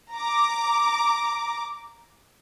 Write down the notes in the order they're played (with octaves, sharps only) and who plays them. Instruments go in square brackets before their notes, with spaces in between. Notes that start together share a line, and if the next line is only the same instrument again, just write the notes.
[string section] A#5 D6